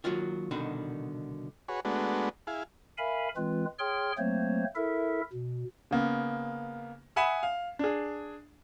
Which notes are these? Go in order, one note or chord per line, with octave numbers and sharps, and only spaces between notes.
D#3 F#3 A#3 F4 F#4
C2 B2 D3 D#3 D#4 F#4
F#4 G#4 B4 C#5
G#3 A3 B3 D4 F#4
E4 G#4 F5
A#4 E5 F5 G#5 B5
E3 G#3 C4 F4 B4
G#4 C#5 G5 C6 F6
F#3 A3 A#3 C4 C5 C#5
E4 A4 A#4 E5
B2
C#3 A#3 B3
E5 F#5 G#5 B5 D#6 E7
F5
D4 G#4